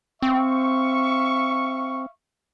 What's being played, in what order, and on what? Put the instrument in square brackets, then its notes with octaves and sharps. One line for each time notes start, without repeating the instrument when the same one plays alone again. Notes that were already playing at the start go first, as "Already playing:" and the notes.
[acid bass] C4 [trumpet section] E5 F5 C#6